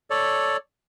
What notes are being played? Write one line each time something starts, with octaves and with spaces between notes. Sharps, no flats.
A4 C#5 D5